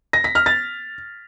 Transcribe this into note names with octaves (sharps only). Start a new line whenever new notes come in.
A#6
B6
F6
A6